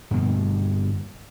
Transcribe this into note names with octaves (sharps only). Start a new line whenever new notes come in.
G2 B2 D3 A#3